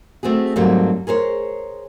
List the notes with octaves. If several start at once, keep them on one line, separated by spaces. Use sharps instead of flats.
A3 C4 F#4 G#4
G#2 F#3 G3 A#3 C4 A4
G#4 A#4 C5 C#5